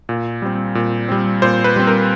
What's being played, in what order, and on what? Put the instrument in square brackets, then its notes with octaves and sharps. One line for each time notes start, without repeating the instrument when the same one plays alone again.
[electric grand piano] A#2
G3 C4
A#2
G3 C4
A#2 C5
B4
G3 C4
A#4